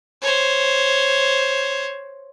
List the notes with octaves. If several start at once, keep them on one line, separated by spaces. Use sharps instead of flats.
C5 C#5